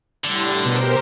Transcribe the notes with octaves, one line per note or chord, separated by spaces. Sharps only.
A2 D3 G3 C6
B2 G4 A#4 C5